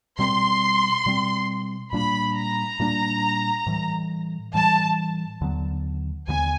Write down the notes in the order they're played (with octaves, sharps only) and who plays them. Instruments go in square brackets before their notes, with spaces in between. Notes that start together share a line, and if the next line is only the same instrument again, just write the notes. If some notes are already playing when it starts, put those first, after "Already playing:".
[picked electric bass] B2 G3 C4 [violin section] C6
[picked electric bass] B2 G3 C4
[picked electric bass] A#2 G3 A#3 D4 [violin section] B5
[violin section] A#5
[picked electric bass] A#2 G3 A#3 D4
A2 E3 G3
[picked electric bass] A2 E3 G3 [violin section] A5
[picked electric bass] D#2 D3 F#3 B3
[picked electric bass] D#2 D3 F#3 B3 [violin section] G#5